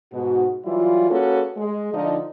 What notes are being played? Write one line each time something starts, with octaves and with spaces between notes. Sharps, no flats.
G#2 B2 F#4
E3 F#3 G3 E4 F4
A#3 C#4 F#4 G#4 A4 B4
G#3
D3 F3 D#4